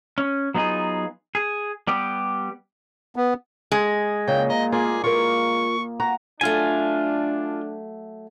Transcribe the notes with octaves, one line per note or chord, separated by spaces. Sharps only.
C#4
F#3 B3 D#4 F4 G#4
G#4
G3 B3 G4
B3
G#3 D#5 G#5
A#2 C#3 G5
D#5 A#5
A#3 F4 G#4
F4 A#4 C#6
F#4 A#5
F#3 A3 D4 F4 G#5